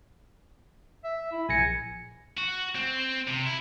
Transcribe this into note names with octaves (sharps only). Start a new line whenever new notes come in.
E5
E4
A#1 G#5 A#6 C#7
F#4
C4
C3
E4